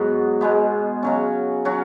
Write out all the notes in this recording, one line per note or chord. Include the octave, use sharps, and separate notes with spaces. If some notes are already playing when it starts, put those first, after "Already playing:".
Already playing: G#2 F#3 B3 F#4
B2 G#3 B3
C#3 F#3 C#4
F#3 C#4 F#4